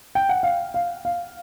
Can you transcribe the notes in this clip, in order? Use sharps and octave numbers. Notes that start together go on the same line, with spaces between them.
G5
F#5
F5
F5
F5